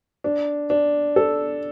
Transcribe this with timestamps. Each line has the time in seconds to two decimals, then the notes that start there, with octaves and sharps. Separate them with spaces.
0.24 D4
0.70 D4
1.16 A4